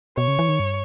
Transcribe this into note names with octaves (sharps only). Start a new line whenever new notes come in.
B2 C#5
C#3
E3
D#3
G2